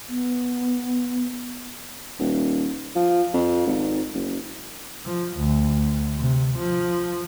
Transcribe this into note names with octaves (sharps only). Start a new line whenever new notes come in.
B3
D#1
F3
F2
G#1
F#1
F3
D2
C3
F3